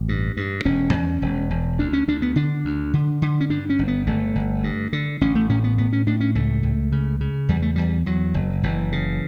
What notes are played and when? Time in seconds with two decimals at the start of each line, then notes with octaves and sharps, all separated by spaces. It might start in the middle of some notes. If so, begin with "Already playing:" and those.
Already playing: A1
0.09 G2
0.37 G2
0.65 E1 C#4
0.93 E2
1.22 E1
1.50 E1
1.79 D2 D4
1.93 C#4
2.08 D2 D4
2.22 B3
2.36 D3 D4
2.65 D2
2.93 D3
3.22 D3
3.41 C#4
3.50 G2 D4
3.70 C#4
3.79 G1
3.88 B3
4.07 G1 A3
4.35 G1
4.64 G2
4.93 D3
5.21 A1 C#4
5.35 A3
5.49 A2 C#4
5.64 B3
5.78 A2 B3
5.93 C#4
6.07 A2 D4
6.20 C#4
6.35 C#2 A3
6.63 C#2
6.92 C#3
7.21 C#3
7.49 E2 G3
7.62 A3
7.76 E2 G3
8.06 E2 F#3
8.34 F#1
8.63 F#1 E3
8.92 C#3